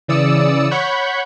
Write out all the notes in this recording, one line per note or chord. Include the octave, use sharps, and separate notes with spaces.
C#3 E3 D5 D#6 E6 C#7
C#5 F#5 B5 C#6 G6